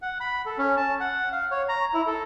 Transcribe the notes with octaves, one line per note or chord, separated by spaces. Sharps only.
F#5
B5
A4
C#4
A5
F#5
F5
C#5
A#5
E4
A4